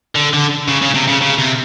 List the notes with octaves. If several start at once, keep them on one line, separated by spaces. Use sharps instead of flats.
D3
D3
C#3
C#3
C3
C#3
C#3
C3